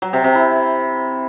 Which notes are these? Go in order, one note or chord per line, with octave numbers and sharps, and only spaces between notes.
F#3
C3
C3
E4